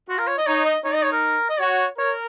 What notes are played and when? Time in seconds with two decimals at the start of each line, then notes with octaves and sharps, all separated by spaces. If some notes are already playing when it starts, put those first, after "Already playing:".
0.09 F4 F#4
0.19 A#4
0.27 C#5
0.38 D#5
0.47 D#4 C#5
0.65 D#5
0.85 D#4 C#5
0.94 D#5
1.03 C#5
1.13 A#4
1.50 D#5
1.60 F#4 C#5
1.98 A#4 C#5